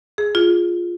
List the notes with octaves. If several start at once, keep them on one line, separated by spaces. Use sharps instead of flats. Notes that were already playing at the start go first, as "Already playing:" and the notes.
G#4
F4